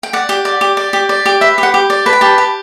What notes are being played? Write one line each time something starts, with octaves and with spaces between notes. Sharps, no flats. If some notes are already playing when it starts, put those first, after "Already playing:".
G5
D5 F#5
G4
D5
G4
D5
G4
D5
G4
B4 E5
G4
F#5
G4
D5
B4 A5
G5
G4 A5
G4